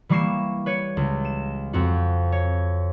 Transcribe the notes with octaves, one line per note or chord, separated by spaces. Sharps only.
E3 G3 A#3 C#6 C7 E7
B4 C#5 C#7
C#2
E7
F2 C4 F#4
C#5